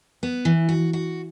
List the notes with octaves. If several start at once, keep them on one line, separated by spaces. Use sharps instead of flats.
B3
E3
F#4
F#4